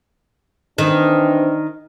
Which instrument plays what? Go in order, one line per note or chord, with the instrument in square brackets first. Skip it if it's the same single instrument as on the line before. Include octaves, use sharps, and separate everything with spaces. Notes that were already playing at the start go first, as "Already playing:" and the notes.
[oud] D#3 [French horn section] E3 C4 D4